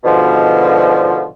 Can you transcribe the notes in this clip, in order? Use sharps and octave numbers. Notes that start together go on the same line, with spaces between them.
G#2 B2 D3 F3